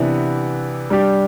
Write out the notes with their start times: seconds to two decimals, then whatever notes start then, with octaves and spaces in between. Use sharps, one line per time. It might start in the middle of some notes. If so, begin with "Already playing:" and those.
Already playing: C3 E3 B3 D4
0.90 G3 D4 G4